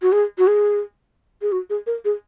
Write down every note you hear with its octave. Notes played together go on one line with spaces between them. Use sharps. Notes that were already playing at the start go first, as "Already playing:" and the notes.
F#4
G#4
F#4
G#4
G#4
F#4
G#4
A#4
G#4